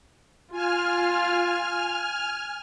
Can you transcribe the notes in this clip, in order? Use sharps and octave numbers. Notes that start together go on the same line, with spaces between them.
F4 G#5 F6